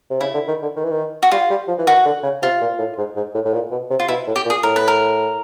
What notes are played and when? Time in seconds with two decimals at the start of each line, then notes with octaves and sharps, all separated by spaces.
0.10 C3
0.21 C#3 E4
0.34 D3
0.48 D#3
0.62 D3
0.76 D#3
0.84 E3
0.91 D#3
1.23 F#4
1.31 G3 F4
1.50 G3
1.68 F3
1.78 E3
1.87 D#3 F#4
2.05 D3
2.23 C#3
2.42 C3 F4
2.61 A#2
2.79 A2
2.98 G#2
3.16 G#2
3.35 A2
3.45 A2
3.54 A#2
3.71 B2
3.91 C3
4.00 F4
4.08 B2 E4
4.27 A2
4.36 G4
4.45 A#2
4.50 G#4
4.63 A2 A#4
4.76 B4
4.88 A#4